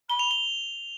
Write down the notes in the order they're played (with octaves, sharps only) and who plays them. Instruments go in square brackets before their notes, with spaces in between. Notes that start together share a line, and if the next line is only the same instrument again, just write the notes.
[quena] B5 [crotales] G7
[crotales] F7
G7